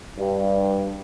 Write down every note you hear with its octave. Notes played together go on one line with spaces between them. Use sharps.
G2